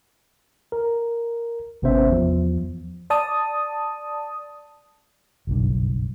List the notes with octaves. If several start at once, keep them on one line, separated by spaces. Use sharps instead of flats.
A#4
G#1 C3 B3 C#4 C5 E5
E2 F3
D5 A5 D#6
F#1 B1 G2